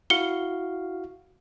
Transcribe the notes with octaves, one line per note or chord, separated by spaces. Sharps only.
E4 F#4 F5 C#7 G7